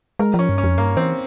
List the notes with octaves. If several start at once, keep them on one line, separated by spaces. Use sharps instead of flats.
G#3 A#4
F3 C#4
G2
C#4
F2
G2 A#3
E3 C4